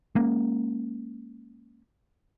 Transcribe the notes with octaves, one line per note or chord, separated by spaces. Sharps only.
G#3 A#3 C#4